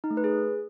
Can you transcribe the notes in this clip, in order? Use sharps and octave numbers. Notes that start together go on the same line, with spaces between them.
D#4
A3
B4
G#4